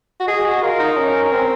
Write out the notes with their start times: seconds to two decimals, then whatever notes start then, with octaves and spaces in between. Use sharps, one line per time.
0.20 F#4
0.27 G#4 D#5
0.45 F#4
0.62 F4 A#4
0.80 D#4
0.97 C#4
1.32 C4